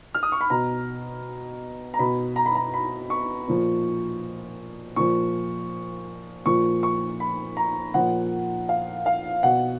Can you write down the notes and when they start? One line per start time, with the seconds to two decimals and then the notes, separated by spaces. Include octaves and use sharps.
0.14 F6
0.23 D#6
0.32 C#6
0.41 B5
0.50 B2 A#5
1.94 A#5
1.99 B2 B5
2.36 A#5
2.46 B5
2.55 A#5
2.74 B5
3.10 C#6
3.48 A#2 F3
4.96 A#2 F3 C#6
6.46 A#2 F3 C#6
6.83 C#6
7.20 B5
7.57 A#5
7.94 A#2 F3 F#5
8.69 F5
9.06 F5
9.43 B2 F#5